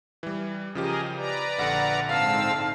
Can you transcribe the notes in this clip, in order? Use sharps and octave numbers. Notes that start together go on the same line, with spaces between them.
E3 G3
C#3 F3 G4 G#4 A#4 D#5
B4 D5 A#5
A#1 D3 F#5
G#2 C4 F5 A5 E6